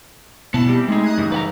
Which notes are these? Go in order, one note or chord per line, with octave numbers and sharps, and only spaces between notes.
B2 B3 E4 A5
G3 C4 G4
G#3 A3 D#4 G#4
D#6 F#6 G#6
F#2 C#3 E3 G3
G3 B4 F#5 A#5